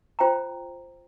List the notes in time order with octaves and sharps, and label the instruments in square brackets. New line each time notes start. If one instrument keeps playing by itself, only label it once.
[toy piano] F4 C5 G5 A#5